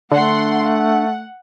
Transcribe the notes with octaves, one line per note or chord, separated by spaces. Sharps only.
D3 A3 D4 F#5 C6
F#5